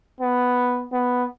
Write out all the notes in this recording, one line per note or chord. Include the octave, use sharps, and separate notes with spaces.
B3
B3